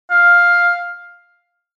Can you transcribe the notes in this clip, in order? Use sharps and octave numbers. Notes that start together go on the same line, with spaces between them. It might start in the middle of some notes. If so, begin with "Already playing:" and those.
F5